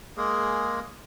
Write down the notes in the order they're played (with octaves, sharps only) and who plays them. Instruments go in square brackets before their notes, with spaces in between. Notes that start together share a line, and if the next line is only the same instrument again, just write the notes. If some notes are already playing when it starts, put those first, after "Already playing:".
[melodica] G#3 A#3 G#4